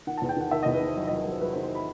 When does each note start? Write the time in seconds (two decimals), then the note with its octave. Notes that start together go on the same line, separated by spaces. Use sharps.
0.07 D#3 F#5
0.17 E2 A5
0.29 G5
0.36 D#3 F#5
0.51 D#3 E5
0.63 E2 D#5
0.74 B4
0.81 D#3 C5
0.96 F#3 D#5
1.07 D#5
1.11 F#3
1.18 D#5
1.26 F#3 C5
1.41 F#3 B4
1.53 C5
1.56 D#3
1.63 C5
1.75 B5